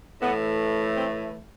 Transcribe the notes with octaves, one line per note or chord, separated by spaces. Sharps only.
A2 E3 A3 B3
C4